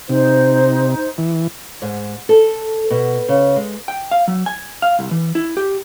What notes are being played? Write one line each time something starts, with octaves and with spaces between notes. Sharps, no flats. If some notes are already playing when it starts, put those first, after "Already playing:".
C3 D#4 C5
E3
G#2
A4
B2
C#3
G#3
G5
F5
F#3
G#5
F5
C2
E3
E4
G4